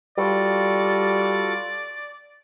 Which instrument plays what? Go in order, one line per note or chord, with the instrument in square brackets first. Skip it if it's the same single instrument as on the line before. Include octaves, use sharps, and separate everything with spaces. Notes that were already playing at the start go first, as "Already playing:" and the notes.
[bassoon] G3 [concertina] F4 F#4 A4 [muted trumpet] D5